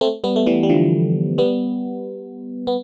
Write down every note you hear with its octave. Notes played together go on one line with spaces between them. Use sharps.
A3 C4
G3 B3
A3
E3 G3
G3
D3 F3
G3 B3
B3